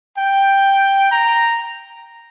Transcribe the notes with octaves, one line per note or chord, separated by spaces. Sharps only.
G5
A#5